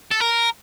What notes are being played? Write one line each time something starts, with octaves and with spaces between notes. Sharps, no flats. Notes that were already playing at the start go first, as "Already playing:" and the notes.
A4
A#4